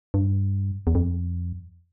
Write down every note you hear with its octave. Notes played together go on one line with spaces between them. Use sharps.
G2
E2
F2